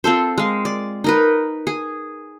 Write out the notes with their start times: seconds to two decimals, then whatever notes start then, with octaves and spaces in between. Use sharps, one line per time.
0.04 C4 F4 A4 C5
0.38 G#3 F5
0.65 D5
1.04 D#4 A#4 B4
1.67 G#4